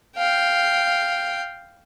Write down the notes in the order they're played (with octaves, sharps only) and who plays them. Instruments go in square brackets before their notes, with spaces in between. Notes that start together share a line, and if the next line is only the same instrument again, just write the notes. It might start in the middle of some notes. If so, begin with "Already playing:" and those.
[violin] F5 G5